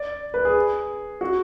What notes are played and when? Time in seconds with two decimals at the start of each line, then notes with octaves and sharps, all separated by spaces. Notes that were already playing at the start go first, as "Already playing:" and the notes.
Already playing: D5
0.34 B4
0.45 G#4
1.21 F#4